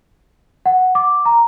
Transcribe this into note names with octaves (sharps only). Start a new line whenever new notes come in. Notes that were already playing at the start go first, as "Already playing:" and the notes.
F#5
D6
A#5